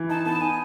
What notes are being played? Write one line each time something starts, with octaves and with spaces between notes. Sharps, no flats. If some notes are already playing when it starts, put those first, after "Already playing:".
Already playing: E3
D#4 A5
B3 A5
D#4 G#5